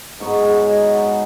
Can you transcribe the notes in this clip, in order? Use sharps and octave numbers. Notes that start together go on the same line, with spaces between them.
G#2 F#3 B3 C#5
G#4
D#4
F#4